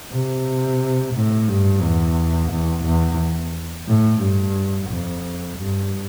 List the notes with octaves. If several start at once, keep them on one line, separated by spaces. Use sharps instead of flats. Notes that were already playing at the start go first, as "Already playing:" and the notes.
C3
A2
G2
E2
E2
E2
A2
G2
F2
G2